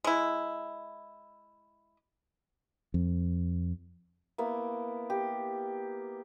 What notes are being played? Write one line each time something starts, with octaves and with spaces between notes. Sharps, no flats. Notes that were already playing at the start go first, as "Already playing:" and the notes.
G#3 E4
F2
A#3 B3 E4
G4